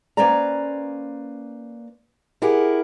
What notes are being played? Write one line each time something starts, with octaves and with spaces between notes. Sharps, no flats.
A#3 C#4 B4 C5 D5 A#5
E4 G4 G#4 A#4 F#5